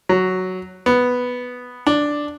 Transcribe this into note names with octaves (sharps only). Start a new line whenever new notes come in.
F#3
B3
D4